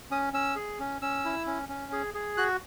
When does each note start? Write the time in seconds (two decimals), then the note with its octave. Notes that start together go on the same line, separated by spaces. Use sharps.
0.11 C#4 D#6
0.33 C#4 E6
0.56 G#4
0.79 C#4
1.02 C#4 E6
1.25 E4
1.46 C#4
1.69 C#4
1.93 G#4
2.14 G#4
2.37 F#4 F#6